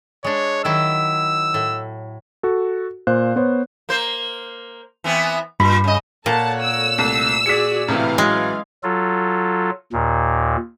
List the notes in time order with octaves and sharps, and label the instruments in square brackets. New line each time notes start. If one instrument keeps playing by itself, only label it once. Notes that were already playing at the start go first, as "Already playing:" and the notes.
[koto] G#3 D4 [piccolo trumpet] C#5
[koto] D#3 F#3 E4 [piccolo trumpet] E6
[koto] A2
[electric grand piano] F#4 A4
A#2 C5 F5 F#6
B3 C5 C#5
[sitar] A#3 C5
E3 B3 C4
[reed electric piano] G2 B5 [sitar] A#2
[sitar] C#3 D#5
[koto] A#2 [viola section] A4 C#5 F#5 [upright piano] A#4 [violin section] A5
[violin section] E6
[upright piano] C2 A3
[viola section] F#4 G#4 D5 [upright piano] B6 C#7
[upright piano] A2 C3 [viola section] E3 F5
[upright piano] A1 F#3 [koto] G#3
[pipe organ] F#3 F4 A4
D#2 A#2